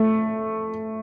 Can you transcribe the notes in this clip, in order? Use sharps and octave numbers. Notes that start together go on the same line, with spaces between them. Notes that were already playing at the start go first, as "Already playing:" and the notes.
Already playing: A3